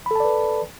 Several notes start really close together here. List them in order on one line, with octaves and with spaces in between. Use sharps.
B5 A4 A5 D5 B4